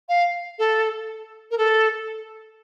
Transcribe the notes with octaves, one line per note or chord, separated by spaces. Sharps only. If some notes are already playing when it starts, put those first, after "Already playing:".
F5
A4
A#4
A4